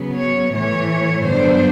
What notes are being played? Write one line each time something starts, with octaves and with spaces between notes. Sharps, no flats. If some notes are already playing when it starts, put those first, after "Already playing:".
Already playing: C#3 F#3 B3
C#5
A2 E3 A3 C#5
G2 D3 F#3 B3 D4 C5